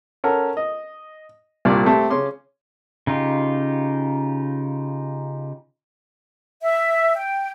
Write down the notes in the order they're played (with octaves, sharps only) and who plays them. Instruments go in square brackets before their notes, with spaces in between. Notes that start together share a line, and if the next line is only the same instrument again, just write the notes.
[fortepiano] C#4 A4 A#4 F#5
D#5
C2 G2 A#2 D5 C#6
A3 C4 G4
C#3 C#4 C6 D6
[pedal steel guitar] C#3 D#4 F4 G4
[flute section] E5
G5